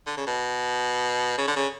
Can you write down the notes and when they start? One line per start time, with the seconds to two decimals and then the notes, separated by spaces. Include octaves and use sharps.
0.07 D3
0.17 C#3
0.27 B2
1.38 C#3
1.48 D3
1.56 C#3